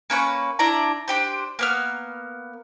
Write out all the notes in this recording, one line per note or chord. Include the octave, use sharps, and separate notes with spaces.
A#3 C#4 B4 C#6
D4 E4 D5 A#5
D4 G4 C5
A#3 B3 F6